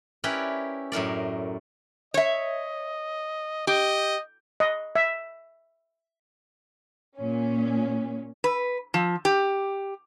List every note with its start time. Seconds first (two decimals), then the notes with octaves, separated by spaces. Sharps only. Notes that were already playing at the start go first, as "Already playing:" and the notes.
0.24 C#4 E4 G4 A#4 B4 D5
0.92 F#2 A2 A#4 D5
2.14 C#5 D#5 E5
3.67 G4 D#5
4.60 D#5
4.96 E5
7.17 A#2 C#4
8.44 B4
8.94 F3
9.25 G4